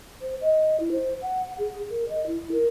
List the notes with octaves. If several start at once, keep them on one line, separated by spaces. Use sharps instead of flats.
C5
D#5
E4
C5
F#5
G#4
A#4
D#5
E4
A#4